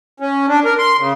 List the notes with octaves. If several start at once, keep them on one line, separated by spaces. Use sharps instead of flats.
C#4
D4
A#4
C6
C#3